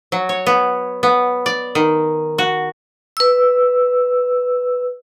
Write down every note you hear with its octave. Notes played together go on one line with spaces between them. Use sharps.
F#3
C#5
B3
B3
D5
D#3
F#4
B4 E6